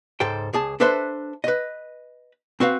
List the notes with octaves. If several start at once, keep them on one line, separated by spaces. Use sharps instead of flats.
C#2 G#2 A4 C5 G5
C#2 G#4 A5
D4 A4 B4 C5 E5 C6
B4 D#5
C4 F#4 B4 F5